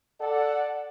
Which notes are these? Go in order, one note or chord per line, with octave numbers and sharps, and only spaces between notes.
A4 D5 F#5